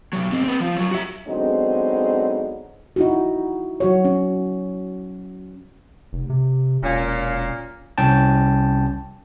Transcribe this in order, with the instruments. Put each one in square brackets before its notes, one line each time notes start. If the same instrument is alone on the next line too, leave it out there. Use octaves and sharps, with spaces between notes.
[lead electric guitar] B1 F#3
G#2 C4
C4 B4
F3
F#2 F#3
F#4 E5
[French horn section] D3 F#3 G#3 B3 C4 D#4
[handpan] D#4 E4 F#4
F#3 F#4 C#5
C#4
[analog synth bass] F1
C3
[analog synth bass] E1 [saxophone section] A#2 A#3 C#4
[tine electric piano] C2 C#4 G5 A5